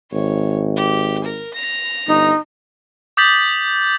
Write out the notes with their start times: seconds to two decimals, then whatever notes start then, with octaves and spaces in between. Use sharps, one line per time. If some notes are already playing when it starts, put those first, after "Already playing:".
0.12 G#1 C#5
0.76 G4
1.24 A#4
1.54 A#6 F7
2.07 G1 D#4
3.17 D6 D#6 G6 A6 B6 F#7